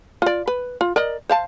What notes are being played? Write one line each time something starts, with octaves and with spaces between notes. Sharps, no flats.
F4 D5
B4
F4
A#4 D5 D#5
C5 F5 A5